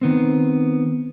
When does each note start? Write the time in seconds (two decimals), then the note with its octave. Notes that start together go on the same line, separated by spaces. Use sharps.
0.01 D#3 B3 C4